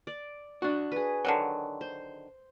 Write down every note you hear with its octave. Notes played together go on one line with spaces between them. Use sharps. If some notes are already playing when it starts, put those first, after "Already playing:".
D5
D4 F#4
G#4 B4
D3 D#3 F#3
C5